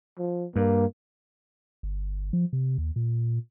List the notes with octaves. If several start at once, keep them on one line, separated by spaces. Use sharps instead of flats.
F3
G2 A#3
G1
F3
C3
D#2
A#2